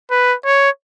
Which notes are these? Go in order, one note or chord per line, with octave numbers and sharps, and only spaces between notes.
B4
C#5